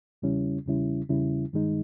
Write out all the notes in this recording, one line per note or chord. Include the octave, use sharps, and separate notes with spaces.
E2 C#3 G3 C#4 E4
E2 C#3 G3 C#4 E4
E2 C#3 G3 C#4 E4
G2 D#3 G#3 D#4